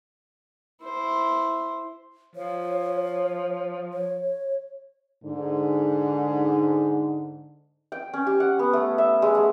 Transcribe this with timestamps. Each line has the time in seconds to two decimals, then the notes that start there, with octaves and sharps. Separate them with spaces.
0.84 E4 C5
2.36 F3 C#5
3.93 C#5
5.24 G#2 D3
7.92 G5
8.13 C#4
8.27 G4
8.40 F#5
8.59 B3
8.73 A3
8.98 E5
9.22 G#3
9.35 A3